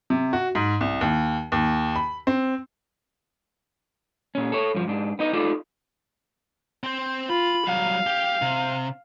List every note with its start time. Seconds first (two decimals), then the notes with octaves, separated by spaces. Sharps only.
0.10 C3
0.33 F#4
0.55 G#2
0.81 C2
1.01 D#2
1.52 D#2
1.96 B5
2.27 C4
4.35 A#2 C#4
4.52 A4 C#5
4.75 G2 F3
4.88 G#2 D4
5.19 B3 D#4 D#5
5.33 D#4 F4 A4 D5
6.83 C4 C5
7.30 F4 B5
7.67 F#3 G3 F5
8.07 G4
8.42 C3